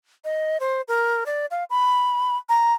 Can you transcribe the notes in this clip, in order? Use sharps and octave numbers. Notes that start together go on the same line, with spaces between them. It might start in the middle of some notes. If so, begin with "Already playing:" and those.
D#5
C5
A#4
D5
F5
B5
A#5